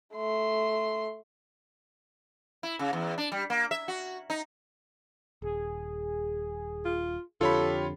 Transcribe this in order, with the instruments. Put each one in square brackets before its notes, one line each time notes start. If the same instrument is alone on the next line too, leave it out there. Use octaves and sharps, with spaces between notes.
[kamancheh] A3 C6
[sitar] E4
C#3
E2
D4
G3
A#3
E5
F#4
D#4
[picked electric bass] D#1 [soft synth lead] G#4
[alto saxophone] F4
[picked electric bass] F2 D3 [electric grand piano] F4 C#5 B5 [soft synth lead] G4 [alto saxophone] A4